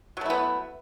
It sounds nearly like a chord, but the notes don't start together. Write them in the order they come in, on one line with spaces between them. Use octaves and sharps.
F#3 A3 E4 B3